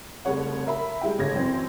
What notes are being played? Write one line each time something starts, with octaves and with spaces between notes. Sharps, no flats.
F1 C2 C#3 C#5 F#5
A#4 E5 B5
G3 G#3 E4 G5
G1 C#3 G#6 A#6
F#2 E3 C4 C#4